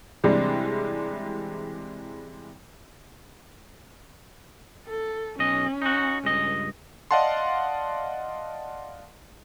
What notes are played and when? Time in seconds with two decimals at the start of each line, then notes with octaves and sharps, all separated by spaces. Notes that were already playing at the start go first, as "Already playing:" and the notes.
0.24 C3 E3 G3 G#3 D4
4.87 A4
5.39 B1 C#4 D#5
5.82 D#4 F#4
6.24 C#2 G2 D#5
7.11 D5 D#5 F5 F#5 A5 C6